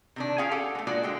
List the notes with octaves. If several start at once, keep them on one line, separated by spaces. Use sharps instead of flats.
C3 D#3 D4
C#4 F4 G#4 F5 G5
G4 A4 F5 F#5
G#3 A3
G#3 A#3 D4 F4 F#4 D5
D3 G#3 G5